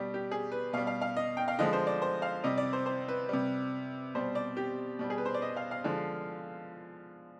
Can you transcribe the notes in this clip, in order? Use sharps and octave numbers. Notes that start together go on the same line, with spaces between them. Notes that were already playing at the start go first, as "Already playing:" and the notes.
Already playing: B2 G3 G4
G4
G#4
B4
B2 G3 F5
F5
F5
D#5
G5
F5
D3 F3 G#3 D#5
C5
D5
C5
F5
C3 G3 D#5
D5
C5
C5
B4
C3 G3
B2 G3 C5
D5
G4
B2 G3
G#4
B4
C5
D5
D#5
F5
F5
D3 F3 G#3